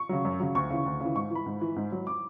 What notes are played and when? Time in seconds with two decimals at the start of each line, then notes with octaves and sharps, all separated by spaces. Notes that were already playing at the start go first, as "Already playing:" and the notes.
Already playing: C#6
0.09 C#3 F#3
0.25 F#2
0.40 C#3 F#3
0.55 D2 C#6
0.70 C#3 E3
0.86 D2
1.01 C#3 E3
1.15 G#2 C#6
1.31 E3 B5
1.46 G#2
1.61 E3
1.76 G#2
1.92 F#3
2.07 D6